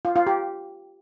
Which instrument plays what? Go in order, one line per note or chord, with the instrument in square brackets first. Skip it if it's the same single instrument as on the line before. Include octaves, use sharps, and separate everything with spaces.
[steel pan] F4
F4
G4